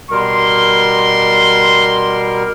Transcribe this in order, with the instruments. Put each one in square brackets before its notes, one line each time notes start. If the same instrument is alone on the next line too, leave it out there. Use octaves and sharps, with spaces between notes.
[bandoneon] B2 G3 A#4 [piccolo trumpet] C6